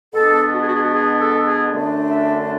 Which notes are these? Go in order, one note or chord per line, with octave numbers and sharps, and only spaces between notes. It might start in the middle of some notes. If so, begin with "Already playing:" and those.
B2 G#3 B3 D4 A4
F#4
G#4
F#4
G#4
F#4
G#4
A4
G#4
F#2 D3 A3 D4
E5